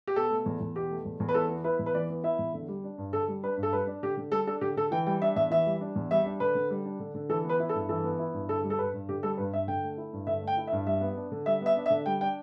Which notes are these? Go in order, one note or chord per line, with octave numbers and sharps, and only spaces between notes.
G4
B2 A4
A3
E2
E2
B2 G4
A3
E2
E2
B4
E3 A4
B3
E4 B4
E2
B4
E3 D5
B3
E4 E5
E2
D3
G3
D4
G2
D3 A4
G3
D4 B4
G2
A4
G3 B4
D4
D3 G4
D3
G3 A4
D4 A4
D3 G4
D3 A4
E3 G5
G3 G5
D4 E5
E2 E5
E3 E5
G3
D4
E2
G3 E5
D4
D3 B4
D3
G3
D4
D3
D3
E3 A4
B3
B4
E4
A4
G2
E3 A4
B3
E4
G2
D3 A4
G3
A4
G2 B4
G2
D3 G4
G3 A4
G2 B4
G2 E5
D3 G5
A3
E4
G2
D3 E5
A3
G5
E4
E5
G2
G3 E5
B3
D4
D3
G3 E5
B3 E5
D4
E5
D3
G3 G5
D4 G5